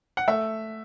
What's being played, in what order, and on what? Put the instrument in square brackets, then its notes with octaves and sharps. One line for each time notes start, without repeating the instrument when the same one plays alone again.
[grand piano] F#5
A3 E5